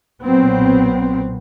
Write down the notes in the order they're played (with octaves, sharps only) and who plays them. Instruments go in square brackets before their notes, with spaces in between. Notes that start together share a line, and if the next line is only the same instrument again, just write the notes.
[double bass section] B1 A#2 F#3 B3 C4